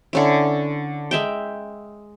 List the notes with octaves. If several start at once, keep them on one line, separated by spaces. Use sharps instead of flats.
D3 C#4 E4
G#3 E5 G5